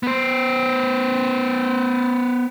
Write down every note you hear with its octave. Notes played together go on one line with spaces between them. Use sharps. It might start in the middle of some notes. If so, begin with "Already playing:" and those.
B3 C5